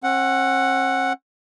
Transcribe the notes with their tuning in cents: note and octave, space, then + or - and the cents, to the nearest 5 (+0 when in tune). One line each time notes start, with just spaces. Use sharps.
C4 +45 F#5 +0